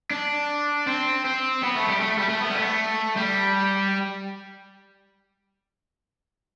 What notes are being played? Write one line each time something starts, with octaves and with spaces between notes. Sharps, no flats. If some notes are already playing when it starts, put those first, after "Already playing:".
D4
C4
C4
B3
A3
G3
A3
G3
A3
B3
G3
A3
G3